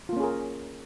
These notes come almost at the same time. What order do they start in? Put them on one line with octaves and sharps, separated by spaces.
F4 A#3 C#4 G#4 A#4